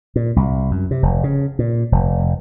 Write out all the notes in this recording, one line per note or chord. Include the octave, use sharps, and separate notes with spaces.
A#2
C2
F#2
C3
F1
C#3
A#2
F1